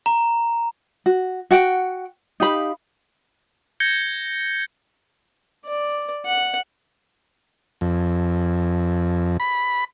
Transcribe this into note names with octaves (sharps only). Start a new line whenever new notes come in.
A#5
F#4
F#4 F#5 G5
D#4 G4 F5 B5
G6 G#6 A#6 C#7 G7
D5
F#5
F2
B5